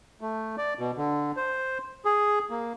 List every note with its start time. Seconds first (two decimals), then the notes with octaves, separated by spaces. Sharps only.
0.21 A3
0.58 D5
0.79 B2
0.97 D3
1.37 C5
2.05 G#4
2.50 A#3